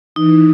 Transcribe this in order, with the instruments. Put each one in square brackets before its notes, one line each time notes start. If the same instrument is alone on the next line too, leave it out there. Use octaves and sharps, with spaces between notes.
[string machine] E3 [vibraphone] D#4